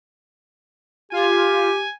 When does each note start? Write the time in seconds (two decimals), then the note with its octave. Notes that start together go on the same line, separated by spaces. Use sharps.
1.12 F4 G4 G#5